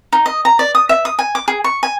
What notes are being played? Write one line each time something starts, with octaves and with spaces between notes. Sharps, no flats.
D#4
D#5
A#5
D5
D#6
E5
D#6
G#5
D6
G#4
C#6
G#5